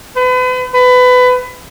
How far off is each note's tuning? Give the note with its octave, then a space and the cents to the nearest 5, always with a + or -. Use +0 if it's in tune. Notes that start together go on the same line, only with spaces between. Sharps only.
B4 +40
B4 +25